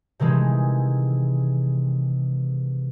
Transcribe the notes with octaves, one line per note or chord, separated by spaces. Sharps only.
C3 D#3 E3 G#3